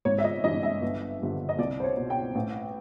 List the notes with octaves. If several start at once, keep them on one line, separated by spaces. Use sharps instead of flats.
G#1 C#5
E5
D#5
G2 E3 D#5
E5
G1
G2 D3 F3
D#5
C2 D5
C5
C#5
B2
G5
A1